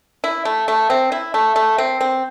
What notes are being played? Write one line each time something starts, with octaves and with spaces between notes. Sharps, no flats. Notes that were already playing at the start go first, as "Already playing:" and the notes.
E4
A3
A3
C4
E4
A3
A3
C4
C4